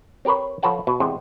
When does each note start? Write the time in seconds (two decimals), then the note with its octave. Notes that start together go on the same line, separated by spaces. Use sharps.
0.25 C4 G4 A#4 B4 C#5
0.63 F3 A4 B4 C#5 F#5 A5
0.87 B2
1.00 E2 C3 G#3 C4